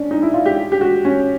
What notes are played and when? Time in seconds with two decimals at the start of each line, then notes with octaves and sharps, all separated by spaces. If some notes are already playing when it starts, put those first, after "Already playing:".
Already playing: C#4 D4
0.11 D#4
0.22 E4
0.34 F4
0.46 G4
0.72 G4
0.81 F#4
1.05 C#4